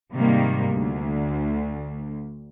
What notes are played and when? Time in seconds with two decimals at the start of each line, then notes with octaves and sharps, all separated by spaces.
0.12 G#2 C3 D#3 G3 A#3
0.71 D2